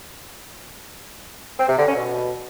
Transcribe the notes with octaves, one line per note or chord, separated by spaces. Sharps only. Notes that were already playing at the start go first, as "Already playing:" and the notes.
C4
C3
D3
C#4
B2